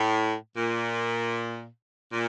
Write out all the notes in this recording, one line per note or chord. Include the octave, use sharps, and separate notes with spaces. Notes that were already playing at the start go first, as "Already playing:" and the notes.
Already playing: A2
A#2
A#2